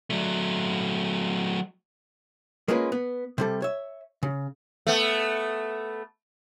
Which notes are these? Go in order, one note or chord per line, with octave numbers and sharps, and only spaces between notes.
F#3 A3
G#3 A#3 C#4 F4 B4
B3
C3 G3 A4
C#5 E5
C#3
A3 B3